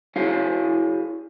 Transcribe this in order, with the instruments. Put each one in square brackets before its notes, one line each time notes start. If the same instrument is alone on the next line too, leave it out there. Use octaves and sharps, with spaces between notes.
[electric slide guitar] E4 F#4 G#4 C#5 F5